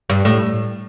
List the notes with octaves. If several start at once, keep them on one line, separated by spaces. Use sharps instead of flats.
G2
A2